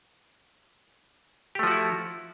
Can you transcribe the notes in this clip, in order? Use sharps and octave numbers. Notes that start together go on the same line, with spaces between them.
F3 A3 E4 F#4 G4